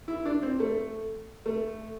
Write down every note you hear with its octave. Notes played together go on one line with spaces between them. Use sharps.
E4
D4
C4
A3
A3